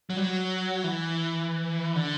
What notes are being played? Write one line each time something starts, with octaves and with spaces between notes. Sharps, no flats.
F#3
G3
F#3
E3
D3